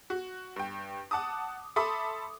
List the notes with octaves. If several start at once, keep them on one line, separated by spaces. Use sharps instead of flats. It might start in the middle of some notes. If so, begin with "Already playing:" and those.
F#4
G2 G5
F#5 A5 D6 D#6
A4 E5 B5 C6 D6 D#6